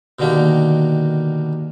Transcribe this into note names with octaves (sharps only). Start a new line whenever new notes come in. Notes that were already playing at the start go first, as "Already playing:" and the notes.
B2 D3 D#3 A#3 G4